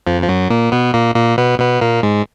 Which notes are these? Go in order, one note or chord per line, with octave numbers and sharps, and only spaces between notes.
F2 F3
F3
F#2 F#3
A#2 A#3
B2 B3
A#2 A#3
A#2 A#3
B2 B3
B2 B3
A#2 A#3
G#2 G#3